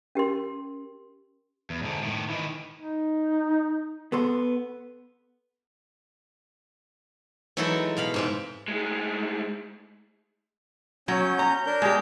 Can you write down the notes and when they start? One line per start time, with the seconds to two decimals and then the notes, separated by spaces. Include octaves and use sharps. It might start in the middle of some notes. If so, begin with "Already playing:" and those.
0.15 C#4 G4 A#4 C6
1.70 E2
1.83 G#2 D3
2.02 A2 D#3
2.30 D#3 E3
2.76 D#4
4.12 B3 A4 C6
7.57 E3 F#3 G#3 D#4 E4 A4
7.97 B2 F5 B5
8.14 G#2 C3 G#3
8.68 A2 G#3
11.08 F#3 C#4 G6
11.39 A#5
11.66 D4 A#4 G6
11.82 G#3 G4